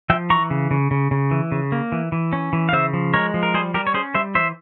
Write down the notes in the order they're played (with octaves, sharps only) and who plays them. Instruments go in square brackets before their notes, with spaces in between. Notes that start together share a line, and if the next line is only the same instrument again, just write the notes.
[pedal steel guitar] F3 E5 G5
E3 A#5 C#6
C#3
C#3
C#3
C#3
E3
C#3
A#3
E3
E3
C#4
E3
F5
C#3 C5 E5
F3
G#3 A#4 C#5
F3
A#4
G3 G#4 C5
G3 G4 A#4
C#5
C#4 G#4 C5
G3 C5 E5
E3 C5 E5